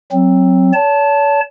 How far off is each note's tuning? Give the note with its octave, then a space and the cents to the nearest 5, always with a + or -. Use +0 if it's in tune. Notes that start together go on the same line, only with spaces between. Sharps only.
F#3 +0 C4 +10
C#5 +40 A5 +0